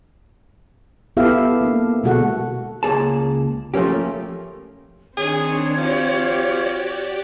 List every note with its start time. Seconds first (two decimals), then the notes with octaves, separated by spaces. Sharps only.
1.17 B3 E4 G4 A4 E5 F5
1.61 A#3 D4
2.04 B2 D3 G#3 F#4 A4 F#5
2.83 C#2 A#3 G#4 A5
3.74 F3 A3 A#3 C#4 G4
5.17 D#3 C4 D4 G#4 C#5
5.77 F3 F#4 G4 D5